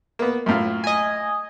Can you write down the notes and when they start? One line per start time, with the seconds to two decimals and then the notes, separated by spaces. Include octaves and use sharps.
0.19 A#3 B3
0.46 F#2 A2 F4
0.84 D#5 G#5